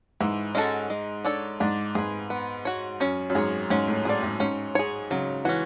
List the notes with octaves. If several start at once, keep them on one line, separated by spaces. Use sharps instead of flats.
G#2 E3
G#3 C#4 F#4 A4
G#3
D4 A4 C#5
G#2 D4
G#2 G#4 B4
B3
F#4 C#5
F#2 C#4
F#2
G#2 G#4 C#5
G#2 C#4
A2
A2 G#4 D5
G#2
G#2 C#4
G#4 C#5
C#3 F#3
E3 C#4 F#4